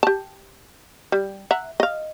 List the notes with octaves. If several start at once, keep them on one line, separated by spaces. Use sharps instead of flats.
G4 A5
G3
E5 F#5 A#5
D#5 F5